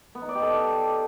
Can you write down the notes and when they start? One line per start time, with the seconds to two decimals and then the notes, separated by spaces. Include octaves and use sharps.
0.15 B3
0.22 D#4
0.29 D5
0.35 G4
0.42 A4